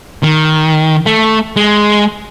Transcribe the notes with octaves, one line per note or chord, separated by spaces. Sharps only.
D#3
A3
G#3